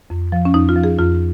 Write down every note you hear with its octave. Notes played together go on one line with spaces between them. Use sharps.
F2
F3
C#4
F2 D#4
F4
F3
G#4
F2 F4